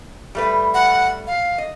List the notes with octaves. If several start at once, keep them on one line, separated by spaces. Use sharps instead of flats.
G3 A3 B4
F#5
F5
D#5